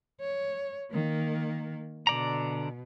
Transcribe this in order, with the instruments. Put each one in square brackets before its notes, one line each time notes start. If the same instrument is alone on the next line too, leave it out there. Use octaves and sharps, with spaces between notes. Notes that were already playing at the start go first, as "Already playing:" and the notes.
[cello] C#5
D#3 A#3
[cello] B2 [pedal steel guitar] D3 D5 A#5